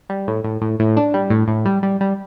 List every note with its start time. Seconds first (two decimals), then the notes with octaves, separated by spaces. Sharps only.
0.09 G3
0.27 A2
0.44 A2
0.61 A2
0.79 A2
0.97 D4
1.14 G3
1.30 A2
1.48 A2
1.65 G3
1.83 G3
2.01 G3